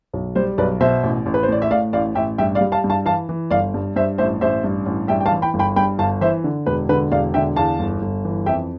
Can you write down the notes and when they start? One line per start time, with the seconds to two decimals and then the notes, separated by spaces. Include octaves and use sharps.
0.13 B1
0.35 G3 C5
0.58 B1 B4 D5
0.80 B2 C5 E5
1.03 A1
1.26 A1
1.34 B4
1.43 C5
1.48 A2 D5
1.62 E5
1.71 A2 D5 F5
1.93 A1 D5 F5
2.15 A1 E5 G5
2.38 G2 E5 G5
2.55 D5 F5
2.61 G3
2.72 F5 A5
2.84 G2
2.89 F5 A5
3.06 E3 F5 A5
3.29 E3
3.51 G1 D5 F5
3.74 G2
3.96 G2 C5 E5
4.18 A1 C5 E5
4.41 A1 C5 E5
4.64 G2
4.86 A1
5.08 G2 E5 G5
5.21 G5
5.26 F5 A5
5.32 E3
5.42 G5 B5
5.54 G1
5.59 G5 B5
5.76 G2 G5 B5
5.99 G1 F5 A5
6.21 E3 C5 E5
6.44 D3
6.66 E1 B4
6.89 D3 B4
7.11 E1 D5 F5
7.34 D3 E5 G5
7.56 E2 F5 A5
7.79 G1
8.02 G1
8.25 E3
8.46 F2 E5 G5